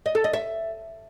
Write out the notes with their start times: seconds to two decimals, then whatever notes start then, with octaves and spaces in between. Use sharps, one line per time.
0.06 D#5
0.15 A4
0.24 D#5
0.33 E5